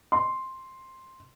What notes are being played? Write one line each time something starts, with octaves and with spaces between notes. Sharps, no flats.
C6